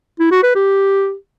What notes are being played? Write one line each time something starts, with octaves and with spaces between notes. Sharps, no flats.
E4
F#4
B4
G4